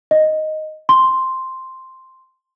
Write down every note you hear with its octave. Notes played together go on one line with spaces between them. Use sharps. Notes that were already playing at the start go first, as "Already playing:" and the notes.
D#5
C6